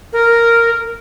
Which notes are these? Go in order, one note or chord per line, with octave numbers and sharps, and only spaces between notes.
A#4